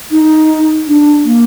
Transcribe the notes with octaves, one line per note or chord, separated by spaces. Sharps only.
D#4
D4
A#3